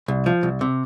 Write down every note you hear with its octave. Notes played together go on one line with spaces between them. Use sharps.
C2
F3
C2
C3